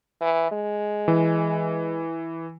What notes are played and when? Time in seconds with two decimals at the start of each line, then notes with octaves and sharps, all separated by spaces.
0.21 E3
0.51 G#3
1.08 E3